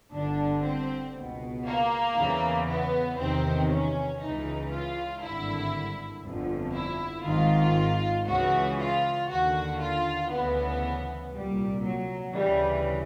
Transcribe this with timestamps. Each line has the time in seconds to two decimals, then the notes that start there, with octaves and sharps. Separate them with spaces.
0.13 G1 G2 D3 D4
0.64 C4
1.15 C#2 B2
1.67 A#3
2.16 E2 C#3 E3
2.68 B3
3.18 E2 C3 D#3 C4
3.70 C#4
4.21 C#2 C#3 E3 D#4
4.71 F4
5.22 G#1 G2 D3 E4
6.25 G1 F2 D3
6.75 E4
7.26 G#1 G#2 D#3 F4
8.27 C#2 C#3 E3 F#4
8.79 F4
9.30 D#2 D3 F#4
9.80 F4
10.31 D2 C#3 E3 B3
11.33 C2 A#2 G3
11.84 F#3
12.35 D2 C#3 E3 G3